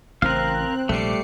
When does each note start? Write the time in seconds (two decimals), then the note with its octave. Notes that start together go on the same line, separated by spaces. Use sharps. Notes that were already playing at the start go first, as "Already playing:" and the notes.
0.22 A1 C#3 E3 C4 A#4 F5 F#6
0.89 A#1 C3 G3 A3 D6 C7 C#7